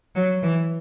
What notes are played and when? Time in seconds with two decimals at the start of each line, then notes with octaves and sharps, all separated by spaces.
0.15 F#3
0.43 E3